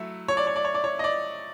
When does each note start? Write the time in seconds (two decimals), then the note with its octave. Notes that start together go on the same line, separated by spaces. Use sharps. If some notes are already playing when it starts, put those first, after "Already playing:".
Already playing: F#3 A3 E4
0.28 C#5
0.37 D5
0.47 C#5
0.56 D5
0.65 C#5
0.74 D5
0.84 C#5
0.99 D#5
1.04 D5